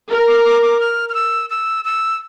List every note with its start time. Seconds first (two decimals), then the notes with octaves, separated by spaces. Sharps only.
0.11 A#4
0.28 D6
0.45 D6
0.62 D6
0.80 F6
1.09 F6
1.14 E6
1.50 E6
1.85 E6